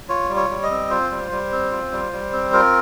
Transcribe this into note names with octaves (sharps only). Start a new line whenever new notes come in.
F4 C#5
G3
C#5
G3
D#5
C4
F4 C5
G3
G3
C4
F4
G3
G3
C4
F4 A#4